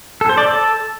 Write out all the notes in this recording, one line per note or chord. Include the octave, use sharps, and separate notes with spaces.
A4
C5
D5
A4